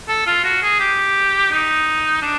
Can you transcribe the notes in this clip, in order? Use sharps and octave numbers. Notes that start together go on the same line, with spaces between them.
A4
F4
F#4
G#4
G4
D#4
D4